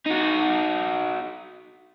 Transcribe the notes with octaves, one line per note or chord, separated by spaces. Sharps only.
D#4 F#4